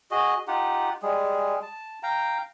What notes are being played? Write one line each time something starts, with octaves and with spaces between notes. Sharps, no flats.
F#4 G#4 D#5
D#4 F4 G4 F#5
G3 G#3 G#4
A5
F5 G5 A#5